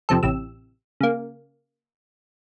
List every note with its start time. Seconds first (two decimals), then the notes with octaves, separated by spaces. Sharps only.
0.09 F2 C3 F3 A4
0.23 A1 C3 E6
1.01 C#3 A#3